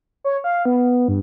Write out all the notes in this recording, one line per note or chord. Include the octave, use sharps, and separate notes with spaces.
C#5
F5
B3
G2